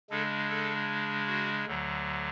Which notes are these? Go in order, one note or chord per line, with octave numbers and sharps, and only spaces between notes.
C#3 G#3 D4 A4
A4
F#4
D2 D3 F#3